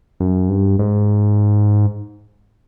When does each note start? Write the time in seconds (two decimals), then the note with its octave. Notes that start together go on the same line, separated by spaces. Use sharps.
0.20 F#2
0.49 G2
0.79 G#2